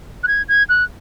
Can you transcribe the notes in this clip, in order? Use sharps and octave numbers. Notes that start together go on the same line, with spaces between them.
F#6
G#6
G#6
F#6